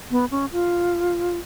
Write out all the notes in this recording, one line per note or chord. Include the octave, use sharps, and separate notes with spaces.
B3
C#4
F4